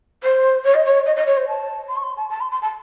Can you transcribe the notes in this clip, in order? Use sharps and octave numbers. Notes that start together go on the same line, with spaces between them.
C5
C#5
D#5
C#5
D#5
D#5
C#5
C5
A5
C6
C#6
C6
A5
A5
C6
C6
A5